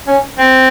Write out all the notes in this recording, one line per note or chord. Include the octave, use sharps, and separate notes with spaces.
C#4
C4